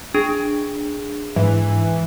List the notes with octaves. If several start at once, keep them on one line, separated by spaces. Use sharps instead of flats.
D4 G#4
G#2 E3